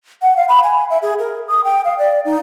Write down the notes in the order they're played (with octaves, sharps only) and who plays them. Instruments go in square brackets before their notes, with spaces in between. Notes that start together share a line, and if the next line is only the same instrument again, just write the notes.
[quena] F#5
F5
B5
G#5
E5
G#4
A#4
D#6
G5
F5
D5
D#4